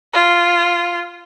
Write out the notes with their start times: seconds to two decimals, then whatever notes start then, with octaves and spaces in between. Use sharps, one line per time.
0.13 F4